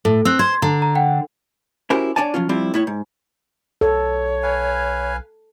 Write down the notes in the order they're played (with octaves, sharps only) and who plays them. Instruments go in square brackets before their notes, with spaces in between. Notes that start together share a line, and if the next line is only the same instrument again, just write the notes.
[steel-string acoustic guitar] A2 [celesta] A4
[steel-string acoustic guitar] C4 [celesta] E6 F#6
[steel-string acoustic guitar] C5 [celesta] C6 G#6
[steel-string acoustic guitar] D3 [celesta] A#5
[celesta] A#5
F#5 G5
[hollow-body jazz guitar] C#4 E4 F#4 G4 A#4 C5
D4 C#5 D5 G#5 A5
F3 F#3 C#4 F4
F3 G3 C4 E4 F4
A2 E4 C#5
G#2
[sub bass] B1 [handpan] A4 [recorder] C#5
[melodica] B4 F5 G#5